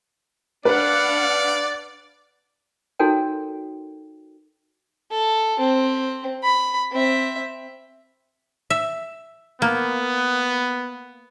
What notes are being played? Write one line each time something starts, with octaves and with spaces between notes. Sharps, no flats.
D4 B4 D5 F5 F#5
D#4 F#4 A4 A#4 C#5 G5
A4
C4
B5
C4 E5
E5
A#3 B3